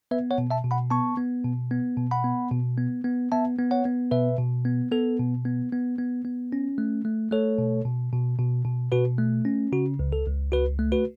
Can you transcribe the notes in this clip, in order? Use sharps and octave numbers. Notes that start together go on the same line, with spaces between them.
B3 B4 E5
C#5 F#5
B2
E5 A5
B2
F#5 B5
B3 A5 C#6
B3
B2
B3
B2
F#5 B5
B3
B2
B3
B3
B3 E5 A5
B3
C#5 F#5
B3
B2 B4 E5
B2
B3
B3 A4
B2
B3
B3
B3
B3
C#4
A3
A3
A3 A4 C#5
B2
B2
B2
B2
B2
B2 F#4 B4
A3
C#4
C#3 F#4
C#2
A4
C#2
C#2 F#4 B4
A3
F#4 B4